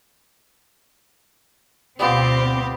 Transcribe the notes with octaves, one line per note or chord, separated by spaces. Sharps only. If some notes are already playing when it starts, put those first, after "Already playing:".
D2 B2 G3 B3 C4 F4 G4